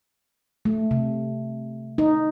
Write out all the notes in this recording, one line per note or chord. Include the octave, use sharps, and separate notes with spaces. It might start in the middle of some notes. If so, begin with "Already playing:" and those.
A3
C3
D#4